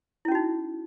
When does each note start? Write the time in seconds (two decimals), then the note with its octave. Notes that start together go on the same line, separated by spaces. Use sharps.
0.25 E4
0.28 C#4
0.32 F#4
0.35 D#4